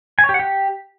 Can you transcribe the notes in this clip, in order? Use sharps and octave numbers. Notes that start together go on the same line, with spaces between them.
G#5
C#5
G4
F#5
G4